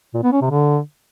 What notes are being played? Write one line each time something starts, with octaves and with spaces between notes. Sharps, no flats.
A#2
B3
C#4
C3
D3